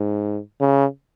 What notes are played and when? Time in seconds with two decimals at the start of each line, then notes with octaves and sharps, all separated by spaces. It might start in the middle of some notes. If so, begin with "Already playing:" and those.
Already playing: G#2
0.61 C#3